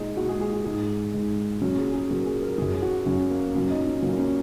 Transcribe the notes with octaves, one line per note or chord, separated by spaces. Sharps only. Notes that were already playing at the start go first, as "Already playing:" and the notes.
Already playing: A#2 G#3 D#4 G#4
A#2 G#3 F#4
G#4
G#4
G#4
G#2 G#3 G#4
G#2 G#3
A#2 F#3 C#4
G#4
G#4
A#2 F#3 A#4
G#4
A#4
F#2 F#3 G#4
F#4
F#2 F#3 C#4
A#3
A#2 F#3 C#4
D#4
C#4
A#2 F#3 A#3
C#4